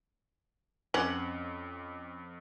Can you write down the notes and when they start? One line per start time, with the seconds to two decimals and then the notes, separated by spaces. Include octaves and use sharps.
0.94 F2 C4 C#4 F#5 D6